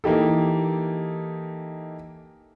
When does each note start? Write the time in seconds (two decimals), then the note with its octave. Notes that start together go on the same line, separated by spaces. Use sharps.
0.04 E3 A#3 D#4 G4 A4